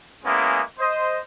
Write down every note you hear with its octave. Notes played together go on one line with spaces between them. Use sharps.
G#3 A#3 B3 C#4 E4
C5 D#5